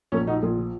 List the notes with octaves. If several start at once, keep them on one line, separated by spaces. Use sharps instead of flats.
A#1 A#3 C#4
A#2 D#4 F#4
A#1 F4 G#4
F3